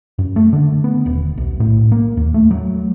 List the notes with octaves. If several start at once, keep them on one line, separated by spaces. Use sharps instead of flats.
F#2
A3
D3
B3
D#1
B1
A2
A#3
D#2
A3
F#3